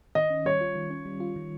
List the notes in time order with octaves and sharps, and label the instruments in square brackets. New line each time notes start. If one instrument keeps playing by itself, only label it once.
[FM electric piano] D#3 [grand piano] D#5
[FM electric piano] C#4
[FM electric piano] G3 [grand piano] C#5
[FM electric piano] F4
D#3
C#4
G3
F4
D#3